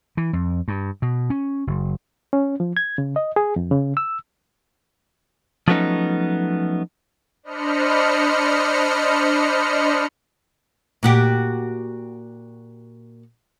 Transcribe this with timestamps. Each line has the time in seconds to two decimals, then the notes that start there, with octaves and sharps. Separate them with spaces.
0.17 E3
0.33 F2
0.68 G2
1.02 B2
1.30 C#4
1.67 F#1
2.33 C#4
2.60 F3
2.77 G#6
2.98 C#3
3.16 D#5
3.36 G#4
3.56 F2
3.71 C#3
3.97 E6
5.68 F3 F#3 A3 B3 C#4 D#4
7.43 D4 C5 D#5 B5 F6 C#7
11.03 A#2 F#4 G4